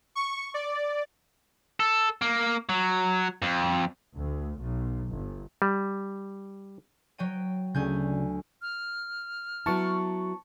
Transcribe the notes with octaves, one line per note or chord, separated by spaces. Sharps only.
C#6
D5
A4
A#3
F#3
F2
D2
B1
G1
G3
F#3 G5 D#7
D2 C#3 G#5 G6
F6
F#3 B3 E4 A5 C#6